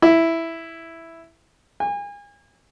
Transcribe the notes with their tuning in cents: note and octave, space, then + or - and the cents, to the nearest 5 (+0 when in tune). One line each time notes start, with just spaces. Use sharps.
E4 +0
G#5 -35